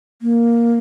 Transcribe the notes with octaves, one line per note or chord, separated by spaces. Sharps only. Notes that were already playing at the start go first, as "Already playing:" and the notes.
A#3